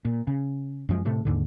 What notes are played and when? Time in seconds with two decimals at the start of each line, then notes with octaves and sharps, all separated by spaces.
0.05 A#2
0.27 C#3
0.89 F#2 F3 G#3
1.05 A2 C3 A3
1.25 D#2 G#2 D3